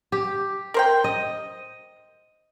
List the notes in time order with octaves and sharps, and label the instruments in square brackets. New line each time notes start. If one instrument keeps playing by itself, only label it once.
[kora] G4
[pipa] A#4 C5 G5
[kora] D#5